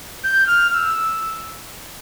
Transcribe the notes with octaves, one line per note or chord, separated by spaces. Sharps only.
G6
F6
F6
E6